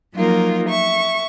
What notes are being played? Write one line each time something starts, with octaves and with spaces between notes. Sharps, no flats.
F3 F#3 A#3 D#4 F4 A#4
E5 C#6